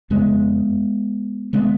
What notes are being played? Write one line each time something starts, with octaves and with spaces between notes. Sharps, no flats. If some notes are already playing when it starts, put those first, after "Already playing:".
F2 C#3 G#3 B3
D3 G#3 B3